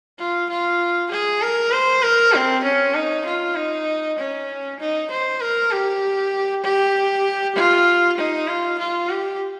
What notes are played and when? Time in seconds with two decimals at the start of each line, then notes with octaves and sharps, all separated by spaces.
0.19 F4
0.50 F4
1.11 G#4
1.41 A#4
1.72 C5
2.03 A#4
2.33 C4
2.64 C#4
2.95 D#4
3.26 F4
3.56 D#4
4.19 C#4
4.79 D#4
5.11 C5
5.40 A#4
5.71 G4
6.64 G4
7.56 F4
8.18 D#4
8.48 F4
8.79 F4
9.10 G4